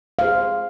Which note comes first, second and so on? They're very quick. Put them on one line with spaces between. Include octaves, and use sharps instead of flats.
F5 C5 G#4